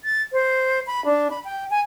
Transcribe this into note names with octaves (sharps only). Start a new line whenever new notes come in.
A6
C5
B5
D4
B5
G5
G#5